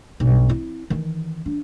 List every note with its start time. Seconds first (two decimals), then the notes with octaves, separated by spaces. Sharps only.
0.20 B1 G2
0.49 C4 E4
0.90 D#3 E3
1.46 D4